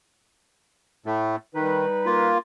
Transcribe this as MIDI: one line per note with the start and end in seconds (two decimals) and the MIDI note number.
1.06 1.36 45
1.06 1.36 57
1.55 1.86 51
1.55 2.31 55
1.55 2.31 63
1.55 2.31 71
2.06 2.38 58
2.06 2.38 65